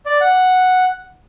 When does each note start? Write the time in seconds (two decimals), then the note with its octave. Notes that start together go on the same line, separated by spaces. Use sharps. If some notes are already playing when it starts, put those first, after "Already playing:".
0.06 D5
0.21 F#5